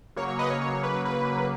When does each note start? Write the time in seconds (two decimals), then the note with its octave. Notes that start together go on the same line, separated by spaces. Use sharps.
0.16 C#3 F#3 A#3 C#5
0.28 C#5
0.39 B4 D#5
0.50 C#5
0.61 C#5
0.83 B4
1.05 B4